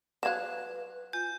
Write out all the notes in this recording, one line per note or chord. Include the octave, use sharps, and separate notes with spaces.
F#3 B4 F5 F#6 G#6 E7
F4 G#5 G6